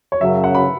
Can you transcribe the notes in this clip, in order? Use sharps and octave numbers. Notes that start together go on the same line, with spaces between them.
C#5
F#2 C#3 F#3 E5
F#5
B5